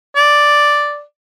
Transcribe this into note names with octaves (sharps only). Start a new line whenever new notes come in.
D5